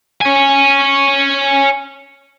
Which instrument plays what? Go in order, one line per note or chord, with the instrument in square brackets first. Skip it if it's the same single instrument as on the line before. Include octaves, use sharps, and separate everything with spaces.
[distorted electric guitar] C#5 G#5